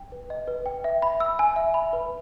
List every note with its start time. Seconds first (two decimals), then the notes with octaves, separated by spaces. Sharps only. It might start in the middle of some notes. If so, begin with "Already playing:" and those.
Already playing: G5
0.12 B4
0.30 D#5
0.48 B4
0.66 G5
0.84 E5
1.02 B5
1.20 E6
1.39 G#5
1.56 E5
1.74 B5
1.93 B4